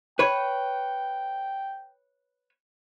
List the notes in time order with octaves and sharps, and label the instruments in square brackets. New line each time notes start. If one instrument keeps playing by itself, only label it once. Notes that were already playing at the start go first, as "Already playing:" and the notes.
[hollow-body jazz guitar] B4 C#5 [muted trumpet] G5